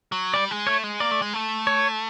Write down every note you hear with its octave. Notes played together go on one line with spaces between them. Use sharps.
F#3
G3 D5
G#3
A3 C#5
G#3
A#3 D5
A3
G#3
A3
C#5